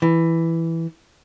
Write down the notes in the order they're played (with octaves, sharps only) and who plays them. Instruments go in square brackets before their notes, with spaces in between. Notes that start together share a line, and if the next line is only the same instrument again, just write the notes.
[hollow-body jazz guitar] E3